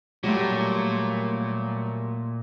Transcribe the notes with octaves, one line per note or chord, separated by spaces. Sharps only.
A#2 F#3 G3 A3